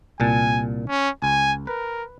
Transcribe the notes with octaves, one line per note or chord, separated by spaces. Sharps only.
C2 A#2 G#5 A5
C#4
C#2 G#5
A#4 B4